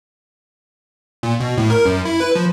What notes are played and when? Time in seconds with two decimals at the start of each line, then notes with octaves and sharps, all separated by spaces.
1.23 A#2
1.40 B2
1.58 A2
1.70 A#4
1.85 F#2
2.05 E4
2.20 B4
2.35 F3